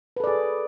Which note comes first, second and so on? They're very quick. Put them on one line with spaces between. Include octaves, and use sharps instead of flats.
B4 A4 D5 G#4